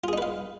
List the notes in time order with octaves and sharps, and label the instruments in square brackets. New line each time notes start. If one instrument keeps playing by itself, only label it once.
[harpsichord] F4
G#4
D#4
B4
F5